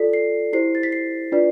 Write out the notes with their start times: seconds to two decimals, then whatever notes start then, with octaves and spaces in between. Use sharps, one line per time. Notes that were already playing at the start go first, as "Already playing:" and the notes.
Already playing: F4 A4 D5 B6
0.13 C7
0.53 E4 G4 C5 C7
0.75 A6
0.83 B6
0.92 C7
1.32 D4 F4 B4 D5